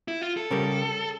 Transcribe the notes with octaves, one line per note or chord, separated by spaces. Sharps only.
E4
F4
A4
C#3 G3 C#4 G4 A#4